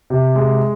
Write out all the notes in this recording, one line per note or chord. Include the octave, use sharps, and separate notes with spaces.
C3
G#3